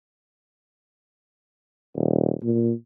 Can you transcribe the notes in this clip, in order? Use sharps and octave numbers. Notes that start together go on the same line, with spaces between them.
D#1
A#2